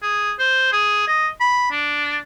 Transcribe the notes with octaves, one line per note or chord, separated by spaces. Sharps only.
G#4
C5
G#4
D#5
B5
D4